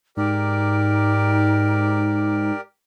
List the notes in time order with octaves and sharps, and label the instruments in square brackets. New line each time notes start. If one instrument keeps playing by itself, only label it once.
[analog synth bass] G#2 [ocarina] D#4 [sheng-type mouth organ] G4 A#4 D5